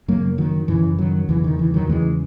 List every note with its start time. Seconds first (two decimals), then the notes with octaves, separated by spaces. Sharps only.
0.08 F#2 C#3 F#3 A#3
0.38 D#3 F#3
0.68 F#2 C#3 E3
0.98 D#3 F#3
1.29 E2 C#3 E3
1.44 D#3
1.59 E3
1.74 D#3 F#3
1.89 E2 C#3 E3 G#3